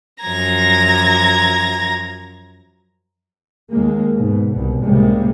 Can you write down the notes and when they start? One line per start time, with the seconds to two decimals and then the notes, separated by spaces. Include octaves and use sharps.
0.23 F#2 F3 A#5 G#6 A#6
3.71 D#2 G#3 A#3
4.16 G#2 B2
4.51 C2 B2
4.83 C#2 A2 C3 G3 G#3 A#3